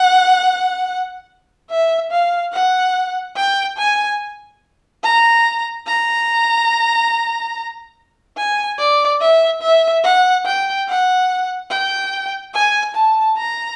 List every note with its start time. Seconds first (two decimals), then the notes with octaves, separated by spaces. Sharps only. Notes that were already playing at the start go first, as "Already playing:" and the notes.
Already playing: F#5
1.69 E5
2.11 F5
2.52 F#5
3.36 G5
3.77 G#5
5.03 A#5
5.86 A#5
8.37 G#5
8.78 D5
9.20 E5
9.61 E5
10.03 F#5
10.45 G5
10.87 F#5
11.70 G5
12.53 G#5
12.95 A5
13.37 A#5